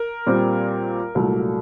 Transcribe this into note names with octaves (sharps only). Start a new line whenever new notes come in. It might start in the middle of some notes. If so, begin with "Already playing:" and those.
Already playing: A#4
A#2 G3 C4
C2 A#2 F#3 A3